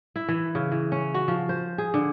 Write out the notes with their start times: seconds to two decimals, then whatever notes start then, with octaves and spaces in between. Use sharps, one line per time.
0.16 E4
0.28 E3
0.55 C#3
0.72 E3
0.92 C#4
1.14 F#4
1.28 F3
1.49 C5
1.78 G#4
1.94 D3